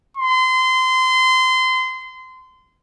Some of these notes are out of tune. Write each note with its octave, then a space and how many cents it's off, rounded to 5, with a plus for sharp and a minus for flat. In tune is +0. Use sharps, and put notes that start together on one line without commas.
C6 -25